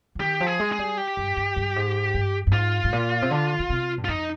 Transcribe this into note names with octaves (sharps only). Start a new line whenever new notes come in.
F3
D#3 G4
F3
G#4
G#3
G#4
G3
G4
G2
G2
G2
G#2
G2
G2
G#2 F4
G#2
A#2
C3
D3
D3
C3
G2
F4
F2 D#4